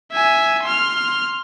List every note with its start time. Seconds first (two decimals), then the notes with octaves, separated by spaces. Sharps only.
0.12 E5 G#5
0.63 C6 F6